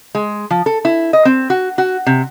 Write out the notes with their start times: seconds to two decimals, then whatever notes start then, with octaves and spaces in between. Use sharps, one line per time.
0.15 G#3
0.50 F3
0.66 A4
0.85 E4
1.13 D#5
1.25 C4
1.50 F#4
1.78 F#4
2.06 C3